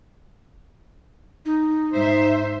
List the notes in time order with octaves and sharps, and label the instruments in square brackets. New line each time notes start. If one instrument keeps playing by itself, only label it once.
[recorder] D#4
[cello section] G#2 C5 E5